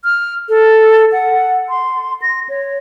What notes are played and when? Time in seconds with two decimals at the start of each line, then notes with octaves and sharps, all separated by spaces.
0.04 F6
0.49 A4
1.12 F#5
1.69 C6
2.22 A#6
2.49 C#5